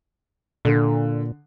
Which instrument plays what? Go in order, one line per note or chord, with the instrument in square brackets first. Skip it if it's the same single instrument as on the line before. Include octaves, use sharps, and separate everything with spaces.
[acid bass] A#2 [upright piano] D3